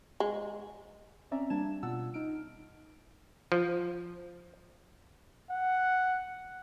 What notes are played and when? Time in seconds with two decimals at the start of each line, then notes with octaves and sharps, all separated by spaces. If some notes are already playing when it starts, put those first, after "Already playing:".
0.20 G#3
1.31 C4 C#4 D5 E5 A#5
1.50 G3 A#3 D4 A5 G#6 E7
1.83 B2 B3 F4 F#5 A5 E6
2.14 D#4 F6 D7
3.52 F3
5.51 F#5